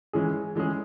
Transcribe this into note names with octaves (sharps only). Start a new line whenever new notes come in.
E3 G#3 C#4 G#4
E3 G#3 C#4 G#4